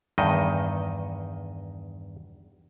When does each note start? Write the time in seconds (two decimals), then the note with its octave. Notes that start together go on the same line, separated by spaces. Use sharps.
0.18 E2 G2 D#3 D#5